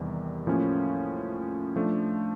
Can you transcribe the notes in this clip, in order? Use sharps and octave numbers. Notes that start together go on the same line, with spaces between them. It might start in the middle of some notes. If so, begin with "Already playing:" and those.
Already playing: E2 C3 D#3 G3
A2 F3 A#3 C#4
F3 A3 D4